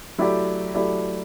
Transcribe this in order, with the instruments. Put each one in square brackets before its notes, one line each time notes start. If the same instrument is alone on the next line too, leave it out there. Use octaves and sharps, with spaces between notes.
[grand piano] F#3 A3 E4 G4 D5
F#3 A3 E4 G4 D5